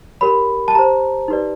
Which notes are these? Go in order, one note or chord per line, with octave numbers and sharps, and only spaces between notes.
G4 A#4 C#5 B5
A5
G4 C5 A#5
D#4 G4 B4 D5